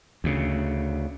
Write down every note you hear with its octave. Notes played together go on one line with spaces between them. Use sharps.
D2 C#3